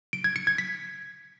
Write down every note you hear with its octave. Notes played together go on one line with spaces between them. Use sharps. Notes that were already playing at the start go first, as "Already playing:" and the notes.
D7
G#6
C#7
G#6
B6